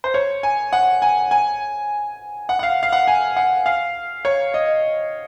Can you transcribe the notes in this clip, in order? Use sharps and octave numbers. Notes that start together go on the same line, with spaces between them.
C5
C#5
G#5
F#5
G#5
G#5
F#5
F#5
F5
F5
F#5
G#5
F#5
F5
C#5
D#5